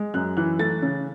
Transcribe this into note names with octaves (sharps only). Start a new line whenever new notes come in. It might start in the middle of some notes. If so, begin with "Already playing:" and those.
Already playing: G#3
F#2 F#6
E3 F#6
A3 A6
C#3